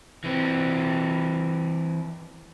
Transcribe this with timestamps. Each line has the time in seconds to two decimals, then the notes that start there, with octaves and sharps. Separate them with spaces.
0.24 E3 C4